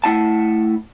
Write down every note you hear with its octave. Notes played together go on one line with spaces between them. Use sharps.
A3 E4 F#5 A5